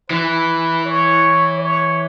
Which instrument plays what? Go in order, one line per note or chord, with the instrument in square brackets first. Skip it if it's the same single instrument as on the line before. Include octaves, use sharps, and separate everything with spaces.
[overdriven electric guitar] E3 [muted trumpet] B4
[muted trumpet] C#5
C#5